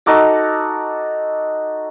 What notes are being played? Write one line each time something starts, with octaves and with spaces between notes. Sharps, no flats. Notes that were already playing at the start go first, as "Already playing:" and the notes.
D#4 F#4 A4 D6